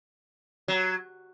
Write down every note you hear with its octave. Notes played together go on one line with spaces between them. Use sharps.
F#3